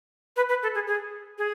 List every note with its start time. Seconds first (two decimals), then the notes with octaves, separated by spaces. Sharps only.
0.37 B4
0.49 B4
0.63 A4
0.75 G#4
0.87 G#4
1.38 G#4